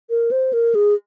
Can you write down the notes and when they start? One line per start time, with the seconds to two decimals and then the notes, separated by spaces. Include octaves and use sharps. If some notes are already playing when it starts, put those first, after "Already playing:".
0.10 A#4
0.31 C5
0.53 A#4
0.75 G#4